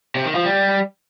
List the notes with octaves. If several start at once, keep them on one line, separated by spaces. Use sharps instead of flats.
C3
D#3
F3
G3